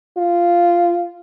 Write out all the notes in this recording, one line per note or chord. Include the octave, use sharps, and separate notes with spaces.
F4